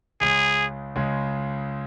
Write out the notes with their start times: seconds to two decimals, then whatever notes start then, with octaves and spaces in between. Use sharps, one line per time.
0.21 C#2 C#3 G#3 G#4
0.96 C#2 C#3 G#3